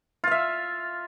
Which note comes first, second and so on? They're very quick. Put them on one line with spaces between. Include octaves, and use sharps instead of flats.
F4 F5 E5